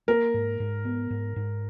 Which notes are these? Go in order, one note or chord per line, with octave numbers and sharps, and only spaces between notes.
A#3 A#4
G#2
G#2
B3
G#2
G#2